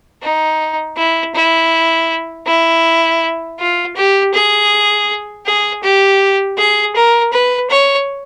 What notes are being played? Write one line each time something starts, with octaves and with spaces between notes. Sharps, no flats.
D#4
E4
E4
E4
F4
G4
G#4
G#4
G4
G#4
A#4
B4
C#5